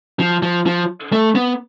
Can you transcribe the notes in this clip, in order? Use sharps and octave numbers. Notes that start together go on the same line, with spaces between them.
F3
F3
F3
A3
B3